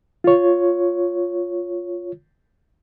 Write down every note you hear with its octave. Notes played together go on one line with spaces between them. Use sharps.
F4 C#5